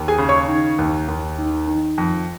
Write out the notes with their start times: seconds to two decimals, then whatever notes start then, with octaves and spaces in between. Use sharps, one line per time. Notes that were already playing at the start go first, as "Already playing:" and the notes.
Already playing: D#2
0.08 G#4 G#5
0.18 C#3
0.29 C#5 C#6
0.48 D#3
0.79 D#2
1.08 D#2
1.38 D#3
1.67 D#3
1.98 F2